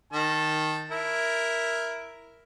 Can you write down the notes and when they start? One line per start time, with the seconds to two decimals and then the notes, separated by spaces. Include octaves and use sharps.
0.13 D#3 A5
0.91 E4 A#4